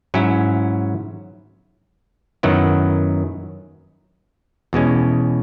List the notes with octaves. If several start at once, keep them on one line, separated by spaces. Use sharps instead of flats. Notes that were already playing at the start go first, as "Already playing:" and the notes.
G#2 F#3 C#4 E4
F#2 D#3 F#3 B3 E4
E2 B2 G#3 C#4